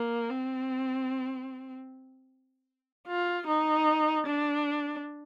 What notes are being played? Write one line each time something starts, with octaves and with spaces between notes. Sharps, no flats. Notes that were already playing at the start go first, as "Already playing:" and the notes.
Already playing: A#3
C4
F4
D#4
D4